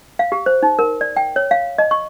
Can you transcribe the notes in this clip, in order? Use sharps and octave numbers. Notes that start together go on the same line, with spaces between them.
F5
G4
C5
D#4
A#4
D5
G5
C#5
F5
D#5
C#6